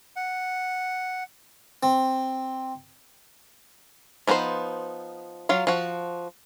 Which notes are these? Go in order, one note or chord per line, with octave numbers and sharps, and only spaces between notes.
F#5
C4
F3 B3 D#4 A4 C5
F#3 F4 F5
F3 F#4